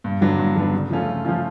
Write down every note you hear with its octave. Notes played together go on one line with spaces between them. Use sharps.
G2
D3 F#3 B3 D4
G2
D3 F#3 B3 D4
C#3
F3 A3 C#4 F4
C#3
F3 A3 C#4 F4